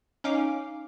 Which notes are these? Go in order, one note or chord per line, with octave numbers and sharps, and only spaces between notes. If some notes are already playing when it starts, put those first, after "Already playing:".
C#4 D#4 F5 D6